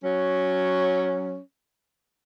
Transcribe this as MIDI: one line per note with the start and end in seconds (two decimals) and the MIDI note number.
0.04 1.39 54
0.04 1.39 61